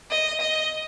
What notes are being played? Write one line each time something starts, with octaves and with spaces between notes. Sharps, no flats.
D#5
D#5